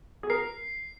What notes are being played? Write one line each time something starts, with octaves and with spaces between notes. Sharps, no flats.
G#4
A#4 C7